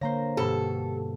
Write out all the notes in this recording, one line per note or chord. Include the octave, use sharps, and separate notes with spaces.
D3 A#3 C5 C#5 F5 A#5 A#6
G2 B2 G4 A4